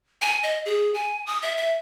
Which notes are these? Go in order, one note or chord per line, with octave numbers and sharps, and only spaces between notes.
G#5
D#5
G#4
G#5
D#6
E5
E5